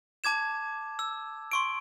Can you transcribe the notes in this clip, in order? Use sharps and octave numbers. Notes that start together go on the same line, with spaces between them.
A5 D6 G#6 E7
E6
C6 C#6 D7